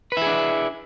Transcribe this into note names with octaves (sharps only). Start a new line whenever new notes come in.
D4 E4 G#4 B4